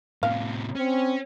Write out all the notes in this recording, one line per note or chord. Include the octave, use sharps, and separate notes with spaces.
A2 C3 F5
C4 C#4